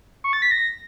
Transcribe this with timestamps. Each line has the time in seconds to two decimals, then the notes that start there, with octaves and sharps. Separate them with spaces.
0.24 C#6
0.33 A6
0.42 B6
0.51 A#6